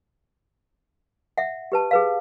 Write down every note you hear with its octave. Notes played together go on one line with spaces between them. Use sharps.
E5 F#5
G4 B4 A5
G#4 B4 F5